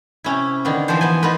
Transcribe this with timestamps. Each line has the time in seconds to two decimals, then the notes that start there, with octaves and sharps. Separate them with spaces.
0.24 C3 C#4 E4
0.65 D3 D#3 A#3 B3
0.88 E3 F3 E4 A4 C5
1.01 B3 C5 G#5
1.23 B3 D#4 F4 A#4 B4